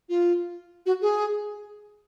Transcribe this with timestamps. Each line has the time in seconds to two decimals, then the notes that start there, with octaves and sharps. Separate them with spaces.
0.09 F4
0.86 F#4
1.02 G#4